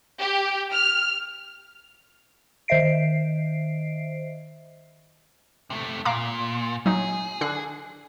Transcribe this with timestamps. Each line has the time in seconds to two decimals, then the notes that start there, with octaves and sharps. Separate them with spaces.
0.19 G4
0.72 F6
2.68 D#3 C5 D#5 E5 C7 D7
5.70 C3 A3
6.05 A#2 F5 A#5 D6
6.86 F#3 D#4 G#4
7.41 D3 F#6 C7